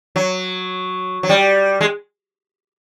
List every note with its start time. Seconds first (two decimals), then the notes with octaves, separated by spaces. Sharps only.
0.16 F#3
1.23 F#3
1.29 G3
1.81 G#3